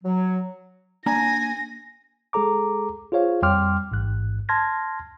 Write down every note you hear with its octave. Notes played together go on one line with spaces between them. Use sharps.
F#3
A#3 D4 G#5 A#5 A#6
G#3 G#4 A4 A#5 D6
F4 G#4 C5 C#5 F5
F2 G3 G5 C6 D6 F6
A1 G#2 F#6
A5 C6 F6 G#6 A#6